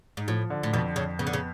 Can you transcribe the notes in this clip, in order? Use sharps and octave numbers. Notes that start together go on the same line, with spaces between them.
G#2
A2 F3
D3
A2
F2 B2
F2 C#3
C#3 B3
D3
C#3